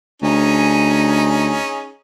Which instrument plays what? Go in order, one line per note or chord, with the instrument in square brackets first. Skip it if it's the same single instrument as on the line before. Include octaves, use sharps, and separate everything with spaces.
[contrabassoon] D2 [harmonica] C#4 D#4 G#4